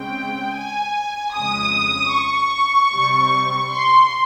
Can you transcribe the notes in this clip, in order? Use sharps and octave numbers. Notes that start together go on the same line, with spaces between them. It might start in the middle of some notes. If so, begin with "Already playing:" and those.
Already playing: C#3 G#3 C4 G5
G#5
F2 C#3 G#3 D#6
C#6
C3 G3 C4
C6